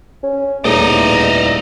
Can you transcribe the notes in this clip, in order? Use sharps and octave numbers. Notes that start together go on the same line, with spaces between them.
C#4
D#1 E2 A3 D#4 D5 D#5